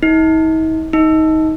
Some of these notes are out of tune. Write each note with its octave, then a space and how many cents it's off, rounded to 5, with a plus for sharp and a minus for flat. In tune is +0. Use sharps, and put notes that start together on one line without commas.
D#4 +45
D#4 +20